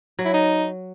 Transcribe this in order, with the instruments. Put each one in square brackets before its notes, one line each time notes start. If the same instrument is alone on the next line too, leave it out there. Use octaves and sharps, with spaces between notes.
[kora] F#3
[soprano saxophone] E4
D#4